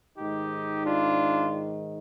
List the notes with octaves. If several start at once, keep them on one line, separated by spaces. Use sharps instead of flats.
G#2 D#3 D#4 G4
D4 F4